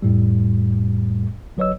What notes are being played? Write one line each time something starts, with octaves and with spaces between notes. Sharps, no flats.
F2 A2 G3
G1 F#3 B4 C#5 D#5 E6